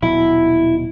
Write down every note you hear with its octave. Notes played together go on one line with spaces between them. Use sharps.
D#1 B2 F#3 E4